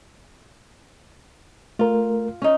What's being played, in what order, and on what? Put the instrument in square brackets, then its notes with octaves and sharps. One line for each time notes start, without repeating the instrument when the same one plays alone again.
[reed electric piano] A3 A#4 [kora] F4
[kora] C#4 D#4